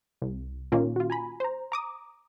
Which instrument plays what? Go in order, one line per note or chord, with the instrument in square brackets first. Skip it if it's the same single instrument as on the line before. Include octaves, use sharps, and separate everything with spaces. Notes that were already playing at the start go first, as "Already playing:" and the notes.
[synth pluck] C2
A#2 D#3 A#3 C#4 F4
F4 F#4
G#5 A#5 B5
C5 A#5
A#5 D6 D#6